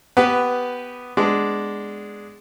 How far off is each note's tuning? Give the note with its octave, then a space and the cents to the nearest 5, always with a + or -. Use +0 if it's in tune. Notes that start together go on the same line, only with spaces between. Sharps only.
B3 +5 G4 -5 B4 +0
G#3 +0 B3 +15 D4 +0